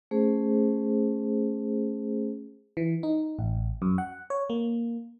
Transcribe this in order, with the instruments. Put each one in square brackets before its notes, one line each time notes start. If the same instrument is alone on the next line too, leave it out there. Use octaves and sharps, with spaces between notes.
[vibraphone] A3 C#4 G#4 C5
[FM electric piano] E3
D#4
A1
F#2
F#5
C#5
A#3